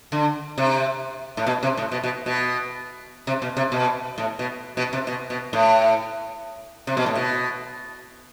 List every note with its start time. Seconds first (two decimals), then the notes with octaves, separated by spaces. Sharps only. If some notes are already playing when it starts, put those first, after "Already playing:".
0.12 D3
0.58 C3
1.37 A2
1.46 B2
1.63 C3
1.77 A2
1.92 B2
2.04 B2
2.26 B2
3.27 C3
3.42 B2
3.57 C3
3.72 B2
4.18 A2
4.39 B2
4.77 B2
4.93 C3
5.07 B2
5.30 B2
5.53 A2
6.87 C3
6.97 B2
7.06 A2
7.15 B2